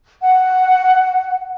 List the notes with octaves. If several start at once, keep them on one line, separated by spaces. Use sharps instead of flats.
F#5